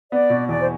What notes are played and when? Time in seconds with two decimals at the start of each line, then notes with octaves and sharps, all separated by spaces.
0.11 B3 D5
0.30 B2
0.49 E2 D5
0.60 C5